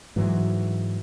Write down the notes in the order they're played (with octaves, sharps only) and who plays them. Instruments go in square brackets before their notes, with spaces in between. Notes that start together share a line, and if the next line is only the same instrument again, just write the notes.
[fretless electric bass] G#2 E3 F#3